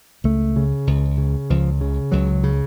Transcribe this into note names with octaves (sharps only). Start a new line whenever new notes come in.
C#2 A3
C#3
C#2
C#3
C#2 F3
C#3
C#2 F#3
C#3